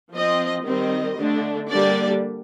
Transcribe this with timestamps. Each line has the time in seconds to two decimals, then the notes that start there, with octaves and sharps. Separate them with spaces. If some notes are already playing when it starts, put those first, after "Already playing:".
0.13 F3 C4 D#5
0.65 D#3 G3 C4 D#5
1.17 D3 A3 D4
1.68 D3 G3 A#3 D4 D5